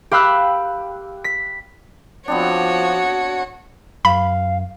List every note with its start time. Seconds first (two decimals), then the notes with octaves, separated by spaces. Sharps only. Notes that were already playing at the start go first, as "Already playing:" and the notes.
0.11 G4 F5 B5 E6 F#6
1.24 B6
2.28 F3 B3 C4 D4 F#4 C#5
4.05 F#2 F5 B5